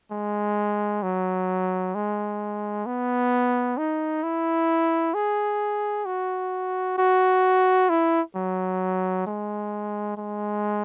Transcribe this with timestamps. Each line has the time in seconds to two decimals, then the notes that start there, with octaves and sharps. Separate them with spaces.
0.11 G#3
1.03 F#3
1.95 G#3
2.86 B3
3.78 D#4
4.23 E4
5.14 G#4
6.06 F#4
6.98 F#4
7.90 E4
8.36 F#3
9.27 G#3
10.18 G#3